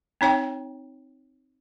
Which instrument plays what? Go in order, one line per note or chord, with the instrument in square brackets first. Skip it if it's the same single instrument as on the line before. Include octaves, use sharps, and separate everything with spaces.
[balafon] C4 D#4 C#5 G5